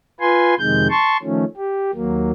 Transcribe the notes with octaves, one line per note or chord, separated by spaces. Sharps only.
F4 B4 G#5 C6
F2 C3 D#3 G#3 G6
A5 C6 C#6
D#3 F3 A3 C#4
G4
D#2 F#3 A#3